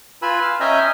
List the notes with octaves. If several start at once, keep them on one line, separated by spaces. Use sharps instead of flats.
F4 B4 G#5 B5 E6
F5
C#4 D#5 E5 G5 G#5 A#5